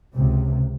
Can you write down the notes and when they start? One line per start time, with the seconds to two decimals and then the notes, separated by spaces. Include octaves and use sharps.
0.16 C#2 C3